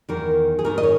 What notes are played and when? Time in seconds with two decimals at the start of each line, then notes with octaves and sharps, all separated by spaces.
0.09 E2 D#3 A#4
0.59 G#4
0.64 G#2 D#3 A#4
0.78 D#5
0.83 C#5